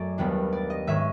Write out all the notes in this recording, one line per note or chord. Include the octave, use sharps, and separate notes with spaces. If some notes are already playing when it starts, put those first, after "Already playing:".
Already playing: F#2 A3 D5
D#2 D#3 G3 B3 D4
D5
D#5
G#2 D#3 G#3 C#4 E5